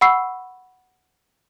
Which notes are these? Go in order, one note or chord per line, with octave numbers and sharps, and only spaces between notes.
F#5 B5 C#6 E6 C7